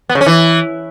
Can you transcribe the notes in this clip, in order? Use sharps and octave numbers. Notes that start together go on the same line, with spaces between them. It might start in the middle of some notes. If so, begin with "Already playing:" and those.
B3
C#3
C#4
E3